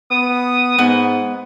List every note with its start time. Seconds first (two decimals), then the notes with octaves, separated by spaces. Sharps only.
0.11 B3 D#6
0.78 G#2 B3